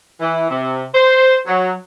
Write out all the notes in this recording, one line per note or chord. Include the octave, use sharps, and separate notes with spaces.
E3
C3
C5
F#3